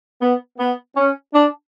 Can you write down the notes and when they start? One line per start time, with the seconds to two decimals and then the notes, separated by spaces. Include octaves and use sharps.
0.21 B3
0.59 B3
0.96 C#4
1.33 D4